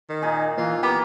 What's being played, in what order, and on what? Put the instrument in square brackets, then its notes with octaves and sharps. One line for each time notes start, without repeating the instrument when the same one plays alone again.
[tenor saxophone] D#3
[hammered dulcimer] A#2 D#4 G#4
[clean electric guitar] E3 A#3 [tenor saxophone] F4
[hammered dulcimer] A#3 [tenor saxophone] B3 [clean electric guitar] G4